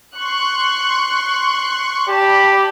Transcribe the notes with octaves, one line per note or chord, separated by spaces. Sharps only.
C6 C#6 F#6
G4 D5 A5 B5